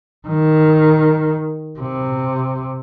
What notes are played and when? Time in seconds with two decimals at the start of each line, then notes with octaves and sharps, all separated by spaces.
0.28 D#3
1.79 C3